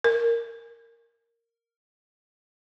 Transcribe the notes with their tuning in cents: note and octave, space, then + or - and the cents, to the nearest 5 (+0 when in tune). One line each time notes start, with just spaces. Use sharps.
A#4 -10